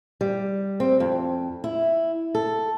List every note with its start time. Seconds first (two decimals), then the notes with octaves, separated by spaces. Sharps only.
0.21 G3
0.80 C4
1.00 F2
1.64 E4
2.35 A4